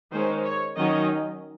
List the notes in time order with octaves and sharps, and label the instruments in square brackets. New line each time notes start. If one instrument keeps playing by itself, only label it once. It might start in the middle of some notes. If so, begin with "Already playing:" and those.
[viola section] D#3 G#3 C#4 C5
C#5
D#3 F#3 C#4 D#5